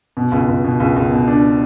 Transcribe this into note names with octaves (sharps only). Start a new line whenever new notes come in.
B2
C#2
C#2
B2
C#2
C#2
B2
D4